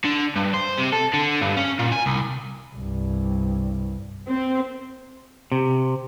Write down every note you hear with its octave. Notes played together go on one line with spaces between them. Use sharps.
D3
G2
C5
C3
A4
D3
G2
C#4
A#2
G#5
C2
C2 G2
C4
C3